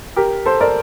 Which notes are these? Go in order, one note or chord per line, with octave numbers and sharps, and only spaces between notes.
G4 A#4
A4 C5
A#4 D5